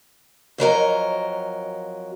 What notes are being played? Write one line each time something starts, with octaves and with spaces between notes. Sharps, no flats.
F2 F#3 A#4 D#5